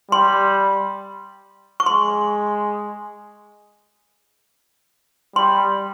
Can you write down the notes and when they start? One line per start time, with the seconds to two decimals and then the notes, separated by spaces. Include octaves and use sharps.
0.11 G3 C6
1.80 C#6
1.86 G#3 C6
5.36 G3 C6